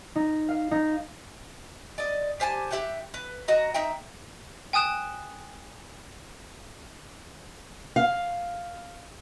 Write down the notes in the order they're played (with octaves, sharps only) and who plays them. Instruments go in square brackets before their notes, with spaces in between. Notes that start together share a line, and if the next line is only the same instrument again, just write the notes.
[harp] D#4
F5
D#4
[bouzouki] D5 D#5
G4 C5 G#5 A5
G4 E5 F#5 G5
B4
F#4 D#5 A#5
D#4 E5 G5
[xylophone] G5 G#5 D#6 F#6 E7
[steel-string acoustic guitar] F5